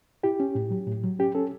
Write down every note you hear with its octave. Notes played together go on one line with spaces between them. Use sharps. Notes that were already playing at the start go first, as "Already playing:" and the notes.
E4 G4
C#4
A2
F#3
A2
F#3
C#4 G4
C#4 A4